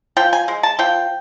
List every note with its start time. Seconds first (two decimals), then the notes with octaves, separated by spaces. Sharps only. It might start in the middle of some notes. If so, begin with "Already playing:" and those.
0.17 F3 G5
0.33 G#5
0.48 G#3
0.63 A5
0.79 F3 G5